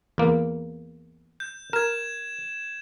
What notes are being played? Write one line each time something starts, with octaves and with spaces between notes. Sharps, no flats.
E2 A#3
G6
A#4 G#6 E7